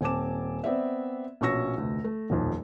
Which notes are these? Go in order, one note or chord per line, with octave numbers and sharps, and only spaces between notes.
D#1 C4 G#5 A5 D6 E7
B3 C4 D5 E5
A#1 B2 C#4 C#6 E6 A#6
F1 D2
A3
D#1 B1 F2